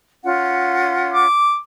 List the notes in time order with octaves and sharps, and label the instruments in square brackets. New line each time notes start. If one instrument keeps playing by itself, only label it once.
[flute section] C#4 F4 F#5
[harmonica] D6